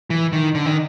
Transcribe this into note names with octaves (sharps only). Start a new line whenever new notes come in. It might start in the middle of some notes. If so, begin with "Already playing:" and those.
E3
D#3
D3
D#3